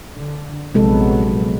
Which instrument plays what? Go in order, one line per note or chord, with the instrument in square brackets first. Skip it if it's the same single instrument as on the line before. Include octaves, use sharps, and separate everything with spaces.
[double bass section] D3
[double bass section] A#1 F#3 B3 [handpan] C3 G#3 A4